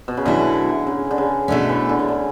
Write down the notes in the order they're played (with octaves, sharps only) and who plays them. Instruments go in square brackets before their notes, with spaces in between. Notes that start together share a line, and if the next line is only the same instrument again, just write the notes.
[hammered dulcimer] B2
C#3
[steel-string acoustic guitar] B2 F#3 A3 E4 [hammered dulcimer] D3
[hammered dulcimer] C#3
D3
C#3
[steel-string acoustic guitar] B2 A3 C#4 [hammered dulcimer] D3
[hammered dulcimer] E3
D3
C#3
D3